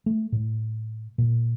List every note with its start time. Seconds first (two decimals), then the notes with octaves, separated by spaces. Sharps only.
0.06 A3
0.32 A2
1.18 A#2